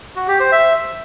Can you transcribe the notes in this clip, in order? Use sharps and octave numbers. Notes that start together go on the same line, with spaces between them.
F#4
G4
C5
E5